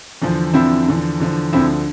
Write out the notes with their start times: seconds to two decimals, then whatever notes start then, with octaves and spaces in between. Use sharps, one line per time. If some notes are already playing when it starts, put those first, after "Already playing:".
0.22 E2 D3 F3
0.54 E2 D3 F3 C4 E4
0.88 E2 D3 F3
1.20 E2 D3 F3
1.53 D2 D3 F3 C4 E4